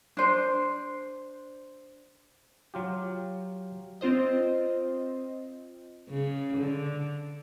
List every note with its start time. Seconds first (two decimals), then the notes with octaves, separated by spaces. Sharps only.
0.17 D4 C5
2.74 F#3 F4 G4
4.01 C4 F4 C5 D#5
6.10 C#3
6.57 D3